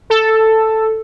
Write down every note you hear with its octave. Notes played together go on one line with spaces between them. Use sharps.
A4